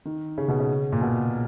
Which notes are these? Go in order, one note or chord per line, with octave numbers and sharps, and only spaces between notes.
D#3
C#3
B2
C#3
A#2
B2